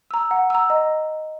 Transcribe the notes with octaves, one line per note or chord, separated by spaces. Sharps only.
A#5 E6
F#5
A#5 E6
D#5